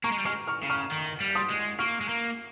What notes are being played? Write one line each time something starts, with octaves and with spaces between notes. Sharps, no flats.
A#3 A#5 C#6
G#3
G3
G#3 C#6 F6
C#6 F6
C#3
C#6 F6
D#3
G3
C6 D#6
G#3
A#3 C#6 F6
G#3
A#3